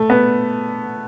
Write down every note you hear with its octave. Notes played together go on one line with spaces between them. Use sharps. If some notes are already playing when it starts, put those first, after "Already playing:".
Already playing: A3
B3